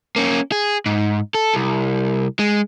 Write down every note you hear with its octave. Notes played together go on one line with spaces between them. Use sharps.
A#3 C#4
G#4
G#2
A4
C2
G#3